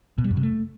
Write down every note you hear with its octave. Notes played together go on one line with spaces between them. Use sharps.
B2
G3
F#2
C3
A3